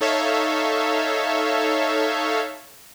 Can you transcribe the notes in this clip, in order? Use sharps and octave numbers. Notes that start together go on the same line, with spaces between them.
D#4 A4 C#5 E5 F5